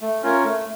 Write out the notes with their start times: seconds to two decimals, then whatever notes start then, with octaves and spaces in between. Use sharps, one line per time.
0.02 A3
0.23 C#4 F4 A#4 C#5
0.44 A3